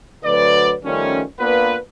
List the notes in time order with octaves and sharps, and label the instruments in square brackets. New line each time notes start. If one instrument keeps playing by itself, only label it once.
[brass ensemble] D2 F#3 B4 D5
D#3 F3 G3 A3 C#4
A#3 B3 D4 F4 B4